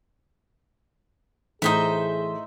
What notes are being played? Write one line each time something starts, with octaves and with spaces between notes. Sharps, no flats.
A2 E3 D#4 G#4 C5 E5 D#6